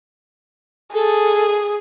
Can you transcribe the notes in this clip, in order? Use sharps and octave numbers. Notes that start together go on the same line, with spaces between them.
G#4 A4